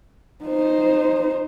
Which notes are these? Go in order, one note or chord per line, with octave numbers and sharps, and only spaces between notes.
D#4 C5